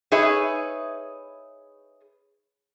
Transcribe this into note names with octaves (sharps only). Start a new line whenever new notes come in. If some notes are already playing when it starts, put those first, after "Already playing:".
D#4 G#4 B4 C#5 E5